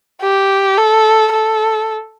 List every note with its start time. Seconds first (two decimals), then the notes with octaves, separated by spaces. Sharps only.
0.22 G4
0.77 A4
1.33 A4